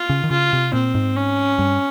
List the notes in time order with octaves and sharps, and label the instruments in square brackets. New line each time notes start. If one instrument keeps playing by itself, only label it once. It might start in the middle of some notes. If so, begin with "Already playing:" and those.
Already playing: [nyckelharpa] F4
[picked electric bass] C#3
D#3
[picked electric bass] C#3 [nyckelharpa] F4
[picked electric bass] C3
[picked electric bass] A#2 [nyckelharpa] C4
[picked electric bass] G#2
[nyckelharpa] C#4
[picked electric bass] G2